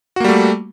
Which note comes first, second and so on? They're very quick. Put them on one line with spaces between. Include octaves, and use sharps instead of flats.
F#4 A#3 G3 A3